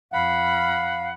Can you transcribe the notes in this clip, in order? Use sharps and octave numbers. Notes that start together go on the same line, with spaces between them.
F2 F5 F#5 B5